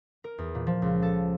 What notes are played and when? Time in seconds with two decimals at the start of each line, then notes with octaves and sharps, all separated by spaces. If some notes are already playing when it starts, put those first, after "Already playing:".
0.24 A#4
0.38 E2
0.55 A#2
0.67 F3
0.82 C#2
1.02 A4